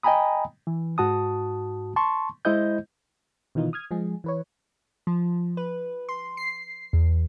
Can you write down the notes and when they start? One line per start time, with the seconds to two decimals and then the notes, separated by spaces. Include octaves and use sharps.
0.03 D#5 G5 G#5 A#5 B5 D#6
0.67 E3
0.98 G#2 F#4 A5 D#6
1.96 A5 C6 C#6
2.45 G#3 E4 C5 D#5 G6
3.55 B2 D#3 E3 D#4 F4
3.73 D#6 F6 G#6
3.91 F3 G#3 G#4
4.24 E3 B4 C#5
5.07 F3
5.57 B4
6.09 C6
6.37 C7
6.93 E2